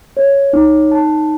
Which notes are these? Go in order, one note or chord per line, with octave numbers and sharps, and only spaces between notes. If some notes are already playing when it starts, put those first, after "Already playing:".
C#5
D#4
A5